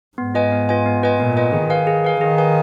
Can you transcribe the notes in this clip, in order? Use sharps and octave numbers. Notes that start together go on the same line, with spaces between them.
G#2 B3
F4 B4 D#5 G#5
B3
F4 B4 D#5 G#5
B3
F4 B4 D#5 G#5
A#2 B3
F4 B4 D#5 G#5
D#3 G#4
B4 F5 G#5
G#4
B4 F5 G#5
D#3 G#4
B4 F5 G#5